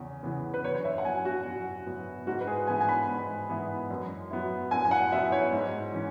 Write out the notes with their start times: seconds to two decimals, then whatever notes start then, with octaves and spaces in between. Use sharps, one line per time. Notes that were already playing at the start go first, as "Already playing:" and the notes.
Already playing: E2 C#3
0.23 C#3 E3 B3
0.54 B4
0.64 F#2 C#5
0.75 C#5
0.85 E5
0.98 F#5
1.05 F#3 B3 G#5
1.25 F#4
1.45 F#2
1.86 F#3 B3
2.27 G#2 F#4
2.41 B4
2.47 G#4
2.67 E3 B3 E4 G#5
2.81 G#5
2.89 B5
3.08 G#2
3.49 E3 B3 E4
3.90 F#2
4.30 F#3 B3 E4
4.71 F#2 G#5
4.85 G#5
4.91 F#5
5.12 F#3 B3 E4 E5
5.32 C#5
5.53 G#2
5.93 E3 C#4